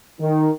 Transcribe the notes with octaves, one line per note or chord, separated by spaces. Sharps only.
D#3